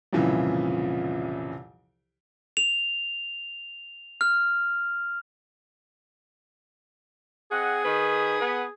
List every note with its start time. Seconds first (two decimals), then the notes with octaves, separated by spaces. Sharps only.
0.13 C2 F2 A#2 C#3 E3
2.57 F7
4.21 F6
7.51 C4 G#4 D#5 F#5
7.85 D#3 B4
8.40 B3 B4